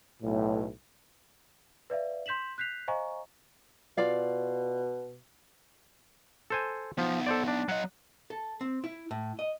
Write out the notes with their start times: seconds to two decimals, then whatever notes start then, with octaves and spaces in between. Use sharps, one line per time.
0.23 B1 A2
1.90 B4 D5 E5 F5
2.26 C6 G6 B6 E7 F#7
2.58 F#6 G6 B6 C7 F7
2.88 C5 D#5 F5 G#5 A#5 C#6
3.97 B2 F4 D5 F5
6.50 A4 C5 G#5
6.98 F3 B3 D#4
7.26 A4 C5 D5
7.48 D4
7.69 F#3 D#5 F#5
8.30 A4
8.61 C4
8.84 E4
9.11 A2
9.39 D#5